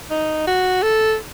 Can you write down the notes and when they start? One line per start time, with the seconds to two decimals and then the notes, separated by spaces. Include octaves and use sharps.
0.10 D#4
0.47 F#4
0.83 A4